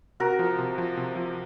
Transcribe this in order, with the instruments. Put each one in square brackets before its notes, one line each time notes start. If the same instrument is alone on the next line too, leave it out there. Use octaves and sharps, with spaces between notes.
[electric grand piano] C3 [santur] F#4 A#4
[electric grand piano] F3
C3
F3
C3
F3